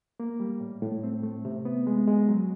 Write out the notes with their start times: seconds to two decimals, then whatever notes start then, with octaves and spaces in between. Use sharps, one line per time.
0.20 A#3
0.40 G3
0.60 A2
0.82 A2
1.03 C4
1.23 A3
1.45 C3
1.65 B3
1.87 G#3
2.07 G#3
2.28 F#3